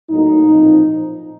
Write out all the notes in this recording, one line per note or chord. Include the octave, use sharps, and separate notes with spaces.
A2 F#3 A#3 D#4
A#2 F3 C4